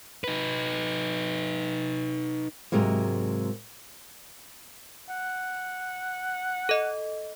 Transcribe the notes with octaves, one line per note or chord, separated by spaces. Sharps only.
D#4 B4
G#2 C3 F#3 G#3 A#3
F#5
A4 D#5